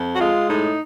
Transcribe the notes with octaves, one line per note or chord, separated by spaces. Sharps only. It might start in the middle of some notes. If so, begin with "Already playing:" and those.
Already playing: F2
F#4
G#3 F4
A2 D#4